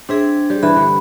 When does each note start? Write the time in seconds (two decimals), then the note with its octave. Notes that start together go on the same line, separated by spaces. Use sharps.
0.09 C4 D4 G#4 E5
0.50 G3
0.63 G2 E3 B5
0.76 D3